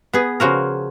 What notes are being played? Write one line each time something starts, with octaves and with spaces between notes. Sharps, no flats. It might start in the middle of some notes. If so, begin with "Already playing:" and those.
B3 G#4
C#3 F3 F#4 A#4